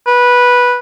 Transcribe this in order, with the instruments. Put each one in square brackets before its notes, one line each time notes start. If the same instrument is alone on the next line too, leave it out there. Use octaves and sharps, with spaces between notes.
[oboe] B4